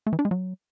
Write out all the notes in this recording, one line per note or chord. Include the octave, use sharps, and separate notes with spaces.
A3
E3
D4
G#3
F#3